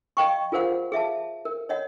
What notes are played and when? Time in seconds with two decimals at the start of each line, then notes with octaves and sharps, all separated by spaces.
0.17 D#5 F5 G5 C#6
0.52 F4 G#4 A#4 C5 F5 F#5
0.92 G#4 E5 F5 A5
1.45 A#4
1.69 C#5 D#5 F#5